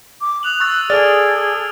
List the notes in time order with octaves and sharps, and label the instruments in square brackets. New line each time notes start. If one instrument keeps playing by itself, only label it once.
[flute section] D6
[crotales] D#6 F7 F#7 [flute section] F#6
[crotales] C#6 E6 A6
[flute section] G#4 A4 [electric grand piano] D5 A6 [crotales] F6 D7